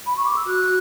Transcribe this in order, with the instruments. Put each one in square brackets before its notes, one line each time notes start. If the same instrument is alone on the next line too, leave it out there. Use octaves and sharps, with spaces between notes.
[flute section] B5
C#6
D6
E6
F#4 F#6